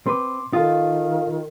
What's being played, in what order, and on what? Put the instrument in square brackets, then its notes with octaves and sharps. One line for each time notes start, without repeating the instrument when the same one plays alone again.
[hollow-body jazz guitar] C4 B4 [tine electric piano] C6 D6
[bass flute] D#3 [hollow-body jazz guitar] F4 A4 [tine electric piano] F5 D#6